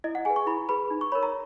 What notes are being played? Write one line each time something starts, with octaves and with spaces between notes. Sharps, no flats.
E4 D#5
F#5
G#4 B4 G#5
C#6
E4 B5
G#4 B4 B5
D#4
C#6
A#4 C#5 B5
A#5